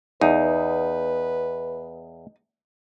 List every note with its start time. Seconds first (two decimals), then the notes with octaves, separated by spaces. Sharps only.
0.21 E2 D#4 B4